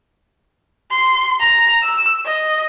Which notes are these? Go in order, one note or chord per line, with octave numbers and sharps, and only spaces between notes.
C6
A#5
E6
D#5